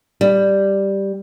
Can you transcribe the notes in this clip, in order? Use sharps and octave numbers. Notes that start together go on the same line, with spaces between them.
G3